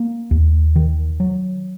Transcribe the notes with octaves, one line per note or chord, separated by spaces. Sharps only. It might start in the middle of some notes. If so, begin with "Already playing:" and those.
Already playing: A#3
D#2
D#3
F#3